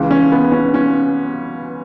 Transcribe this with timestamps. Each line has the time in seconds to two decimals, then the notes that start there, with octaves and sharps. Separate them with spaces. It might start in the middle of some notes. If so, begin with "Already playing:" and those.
Already playing: C#2 C#3 E3
0.11 C#4
0.32 B3
0.52 C#4
0.74 C#4